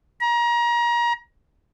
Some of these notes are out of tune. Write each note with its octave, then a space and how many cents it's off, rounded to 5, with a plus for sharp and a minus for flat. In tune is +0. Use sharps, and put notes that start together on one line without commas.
A#5 +30